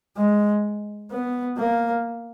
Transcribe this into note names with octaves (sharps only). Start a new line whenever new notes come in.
G#3
B3
A#3